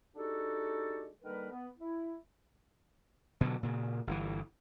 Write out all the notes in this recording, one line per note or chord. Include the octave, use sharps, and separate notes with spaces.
G#3 D4 D#4 F#4 G4 A4
D3 D#3 G3 A#3 A#4 B4
B3
E4
B2 D3 F#3
A#2 C#3
G1 A#2 E3